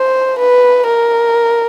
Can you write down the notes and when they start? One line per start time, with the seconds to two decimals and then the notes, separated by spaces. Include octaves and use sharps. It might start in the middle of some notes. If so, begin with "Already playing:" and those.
Already playing: C5
0.39 B4
0.87 A#4